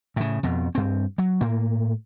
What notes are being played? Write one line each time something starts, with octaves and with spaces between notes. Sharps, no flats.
A2 C#3
F2 B2
G2 C4
F#3
A2 A#3